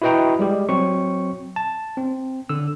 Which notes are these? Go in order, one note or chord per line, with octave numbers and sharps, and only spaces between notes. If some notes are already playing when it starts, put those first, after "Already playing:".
E4 F#4 B4 D#5 G5 A#5
G3 G#3 G4
F#3 C4 C#6
A5
C4
D3 E6